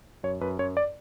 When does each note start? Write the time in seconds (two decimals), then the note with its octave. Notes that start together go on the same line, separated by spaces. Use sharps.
0.23 F#2 C#5
0.41 F#2 B4
0.59 F#2 C#5
0.77 D5